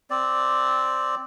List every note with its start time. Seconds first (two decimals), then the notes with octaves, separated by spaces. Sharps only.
0.10 C4 D5